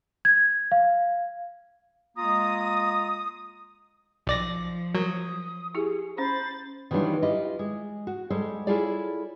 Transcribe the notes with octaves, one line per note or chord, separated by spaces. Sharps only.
G#6
F5
G#3 A#3 F4 A#5 D#6
B1 F3 D5 A#6
F#3 A#4 D#6
E4 G4 G#4
C#4 C5 B5 A6
D#3 E3 F#3 G3 D4 F4
E4 F4 G4 D#5
G#3
F#4
G3 G#3 A4 C5
E4 F4 G#4 A4 C#5 D5